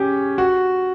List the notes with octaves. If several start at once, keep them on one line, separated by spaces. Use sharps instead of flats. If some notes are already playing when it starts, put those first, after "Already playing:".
Already playing: C#4 G4 G#4
F#4